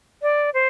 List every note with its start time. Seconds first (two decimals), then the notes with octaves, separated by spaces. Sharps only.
0.22 D5
0.54 C5